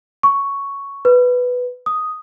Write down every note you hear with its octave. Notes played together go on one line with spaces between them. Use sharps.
C#6
B4
D#6